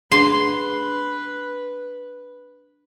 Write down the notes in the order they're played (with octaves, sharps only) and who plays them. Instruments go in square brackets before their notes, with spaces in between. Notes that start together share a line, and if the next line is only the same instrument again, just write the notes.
[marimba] D4 G#4 [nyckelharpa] B4 [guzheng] C6